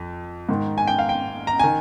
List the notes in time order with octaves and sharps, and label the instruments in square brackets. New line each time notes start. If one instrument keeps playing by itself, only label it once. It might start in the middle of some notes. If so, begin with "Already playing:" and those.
Already playing: [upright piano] F2
G#2 D#3
G#5
G5
F5
G5
A#5
D#3 G#5